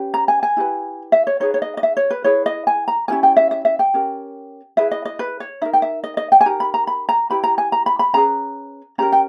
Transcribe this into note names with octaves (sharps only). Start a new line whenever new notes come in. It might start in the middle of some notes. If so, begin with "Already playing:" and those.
Already playing: C#4 G4 B4
A#5
G#5
G#5
E4 G4 B4
E5
C#5
D#4 G#4 B4 C#5
C#5
D#5
D#5
E5
C#5
B4
E4 G#4 B4 C#5
D#5
G#5
A#5
C#4 E4 G4 A#4 G#5
G5
E5
E5
E5
G5
C#4 G4 A#4
E4 G#4 B4 E5
D#5
D#5
B4
C#5
D#4 A#4 E5
G5
E5
D#5
D#5
G5
G#5
D#4 G4 A#4 A#5
B5
A#5
B5
A#5
E4 G4 B4 B5
A#5
G#5
A#5
B5
B5
C#4 G#4 B4 A#5
C#4 G4 A#4 A#5
G5